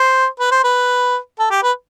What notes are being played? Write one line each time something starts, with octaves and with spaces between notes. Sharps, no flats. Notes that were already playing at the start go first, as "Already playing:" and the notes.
Already playing: C5
B4
C5
B4
A4
G4
B4